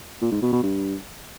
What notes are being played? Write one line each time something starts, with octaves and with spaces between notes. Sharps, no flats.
A#2
G#2
B2
B2
G2